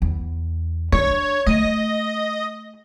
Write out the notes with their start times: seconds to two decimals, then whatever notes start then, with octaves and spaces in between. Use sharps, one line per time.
0.02 E2
0.92 D4 C#5
1.47 A3 D#5